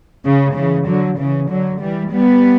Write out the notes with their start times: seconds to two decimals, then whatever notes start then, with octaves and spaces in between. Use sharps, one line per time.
0.24 C#3
0.55 C#3 E3
0.87 D3 F#3
1.18 C#3 E3
1.49 D3 F#3
1.80 E3 G3
2.12 G3 B3